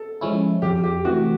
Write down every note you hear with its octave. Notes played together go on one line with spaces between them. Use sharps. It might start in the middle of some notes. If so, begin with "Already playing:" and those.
Already playing: A4
F3 G#3 C#4 E4
F2 G4
G4
C3 E3 A3 F#4